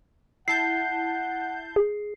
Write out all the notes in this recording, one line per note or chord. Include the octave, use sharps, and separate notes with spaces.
E4 F#5 A5 G6 C7
G#4